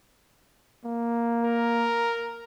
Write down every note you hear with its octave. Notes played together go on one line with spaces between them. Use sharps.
A#3
A#4